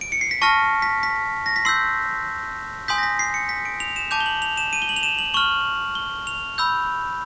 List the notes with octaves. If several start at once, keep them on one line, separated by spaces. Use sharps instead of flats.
D7
C#7
C7
B6
A5 C#6 F6 A#6
B6
B6
A#6
B6
C6 E6 G6 C7
G#5 C6 D#6 G6 B6
A#6
B6
C7
C#7
B6
D7
F7
E7
A5 D6 G6 F7
G7
F#7
F7
E7
D#7
G7
F#7
F7
E7
F#7
C#6 F6 F#7
G7
F7
B5 E6 G6